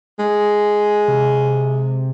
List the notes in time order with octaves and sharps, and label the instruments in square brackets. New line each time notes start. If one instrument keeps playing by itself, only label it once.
[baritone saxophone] G#3
[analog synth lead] C3